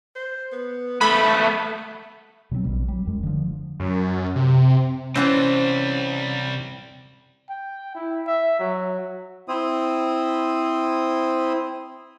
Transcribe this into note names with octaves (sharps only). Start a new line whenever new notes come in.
C5
B3
A3 B3 A4 B5
B2 F#3 G3 C4
A#1 B2 G3
F#3 G3
E1 F#2 G#3
D3 F3
F#2
C3
C3 E3 G3 C4 C#4 C5 F#5 A5
G5
E4
E5
F#3
C4 E4 C5 D#6